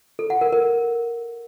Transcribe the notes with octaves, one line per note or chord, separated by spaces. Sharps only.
A4
F#5
A#4
A#4